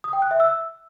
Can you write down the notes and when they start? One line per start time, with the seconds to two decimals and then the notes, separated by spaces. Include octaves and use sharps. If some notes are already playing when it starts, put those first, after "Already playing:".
0.04 D#6
0.13 G5
0.22 F#6
0.31 E5
0.40 E6